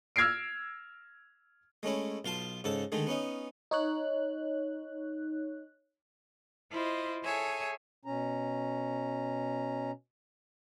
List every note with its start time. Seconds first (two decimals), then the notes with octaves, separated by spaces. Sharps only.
0.16 E6 F6 G#6 A#6 C7 D7
1.83 G#3 A3 C#4 E4
2.25 B1 F4 F5 A5
2.64 G#2 C#3 A4 A5
2.92 D3 D#3 G#3 A3
3.07 B3 C#4 D#4
3.71 D#4 C#5 F#6
6.71 E4 F4 C5 D#5
7.24 G#4 A4 C#5 E5 G#5
8.05 B2 C#4 A#5